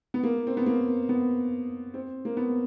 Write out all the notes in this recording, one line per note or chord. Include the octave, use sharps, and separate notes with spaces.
B3
A#3
C4
B3
A#3
B3
C4
A#3
B3